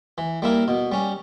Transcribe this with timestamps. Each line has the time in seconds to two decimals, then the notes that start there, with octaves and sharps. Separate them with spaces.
0.18 E3
0.42 G3 A#3 E4 A#4
0.68 B2
0.92 G3 C#4